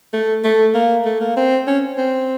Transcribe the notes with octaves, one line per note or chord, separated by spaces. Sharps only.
A3
A3
A#3
A3
A#3
C4
C#4
C4